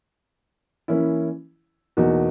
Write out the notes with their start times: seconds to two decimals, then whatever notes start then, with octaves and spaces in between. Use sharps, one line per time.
0.88 E3 A#3 C#4 E4
1.97 E2 B2 A#3 D#4 F#4